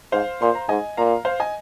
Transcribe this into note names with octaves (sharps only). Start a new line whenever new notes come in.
G#2 C5 F5
A#2 C6
A#5
G#2 D#5 G#5
A#2 F5 A#5
C5 F5
D#5 G#5